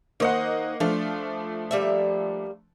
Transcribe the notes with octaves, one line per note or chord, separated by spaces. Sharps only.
D#3 A#3 C5 D#5 F#5
F3 A3 D4 F4
G3 A#3 E5